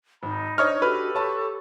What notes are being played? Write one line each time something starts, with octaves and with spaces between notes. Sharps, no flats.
G#1 D#4 B5
D4 C5 C#5 D#5 C#6 D#6 F6
F#4 G4 A4 B4 F6
C#5 A5 B5 C#6